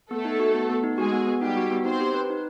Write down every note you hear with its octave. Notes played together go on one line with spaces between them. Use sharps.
A3 B3 A4
D#4
F#4
B3
B3
D#4
G#3 F#4 G#4
B3
B3
G3 D#4 G4
F#4
B3
C4 D#4 C5
G4
B4
D#4